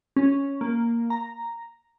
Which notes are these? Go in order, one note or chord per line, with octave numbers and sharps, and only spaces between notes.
C#4
A#3
A#5